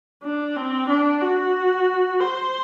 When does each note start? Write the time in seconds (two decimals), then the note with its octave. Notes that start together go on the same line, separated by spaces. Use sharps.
0.23 D4
0.56 C4
0.89 D4
1.22 F#4
2.20 C5